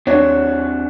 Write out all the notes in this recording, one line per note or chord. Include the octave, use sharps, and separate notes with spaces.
D#2 C4 D4 F#4 C#5